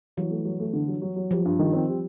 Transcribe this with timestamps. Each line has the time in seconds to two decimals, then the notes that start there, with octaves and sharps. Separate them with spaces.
0.17 E3 F#3
0.31 A3
0.45 F#3
0.60 A3
0.73 D3
0.88 F#3
1.02 F#3
1.16 F#3
1.31 F3 G3
1.45 G2
1.59 D#3
1.73 C4
1.88 G3